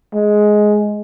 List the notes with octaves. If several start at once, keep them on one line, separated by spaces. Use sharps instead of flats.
G#3